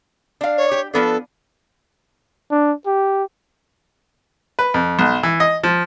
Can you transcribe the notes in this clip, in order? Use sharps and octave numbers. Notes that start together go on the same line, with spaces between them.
D4 F5
C#5
G4
F3 B3 D4 A4
D4
G4
B4
F2
B1
E3
D#5
F3